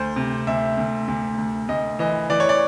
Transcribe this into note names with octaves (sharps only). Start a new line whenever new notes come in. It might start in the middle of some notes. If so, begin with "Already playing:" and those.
Already playing: D2 C5
C3
D2 E5
D2
D2
D2
D2 D#5
E3 D#5
E3 D5
C#5
D5